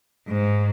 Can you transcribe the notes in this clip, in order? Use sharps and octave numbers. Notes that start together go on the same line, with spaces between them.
G#2